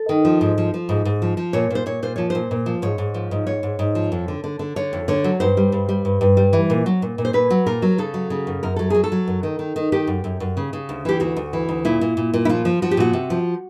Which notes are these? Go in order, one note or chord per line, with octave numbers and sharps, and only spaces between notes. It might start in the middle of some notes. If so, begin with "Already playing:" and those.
Already playing: A4
D#3
F3
G#2
F3
F3
G#2
G#2
F3
F3
A#2 C#5
A#2 C5
A#2 C#5
A#2 C5
F3 C#5
A#2 C5
A#2
F3
G#2 C#5
G#2
F3
G#2
G#2 C#5
G#2
G#2
F3
F2
D3
D3
D3
D3 C#5
F2
D3 C#5
F#3
G2 C5
G3
G2
G3
G2
G2
G3
E3
A#2
F#3
A#2
A#2
C5
A#2 B4
F#3
A#2 A#4
F#3
C#3 A4
F#3
C#3
F#2
F#2 A#4
F#3 A4
F#3 G#4
A4
F#3
F#2
D#3
D#3
D#3
D#3 G4
F#2
F#2
F#2
C#3
C#3
D2
E3 G4
D2 F#4
D2
E3
D2
A#2 E4
A#2
A#2
A#2
E4
F3 F4
F3
F3 F#4
G4
A#2 F#4
C3
F3